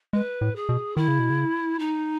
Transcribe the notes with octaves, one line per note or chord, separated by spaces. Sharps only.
G#3 B4
A2
G#4
B2
D#3 E4
C#3
B2
C#3
D#4